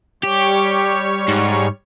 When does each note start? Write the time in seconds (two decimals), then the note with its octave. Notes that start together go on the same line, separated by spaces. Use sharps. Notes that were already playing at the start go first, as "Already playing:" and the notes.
0.23 G3 G4 C#5
1.28 G#2